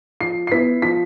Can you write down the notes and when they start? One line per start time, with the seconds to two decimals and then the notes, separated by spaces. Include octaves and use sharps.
0.21 F3 C7
0.47 C7
0.52 B3 E4 B6
0.82 F3 B6